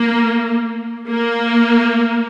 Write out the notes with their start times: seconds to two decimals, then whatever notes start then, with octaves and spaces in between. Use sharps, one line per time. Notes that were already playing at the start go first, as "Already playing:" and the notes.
Already playing: A#3
1.08 A#3